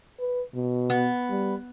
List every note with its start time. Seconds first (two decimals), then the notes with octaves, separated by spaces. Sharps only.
0.20 B4
0.55 B2
0.90 B3
1.30 G3